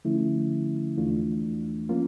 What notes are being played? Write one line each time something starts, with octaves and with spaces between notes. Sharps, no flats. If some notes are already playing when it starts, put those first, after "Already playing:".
D3 F3 A3 C#4 E4
E2 E3 A3 D4 F4
F3 A#3 C#4 F4